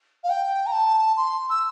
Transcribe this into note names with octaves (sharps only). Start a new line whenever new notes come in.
F5
G5
A#5
A5
C6
E6